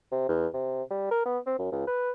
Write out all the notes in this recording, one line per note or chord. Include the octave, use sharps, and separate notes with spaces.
C3
E2
C3
G3
A#4
B3
C4
F#2
C#2
B4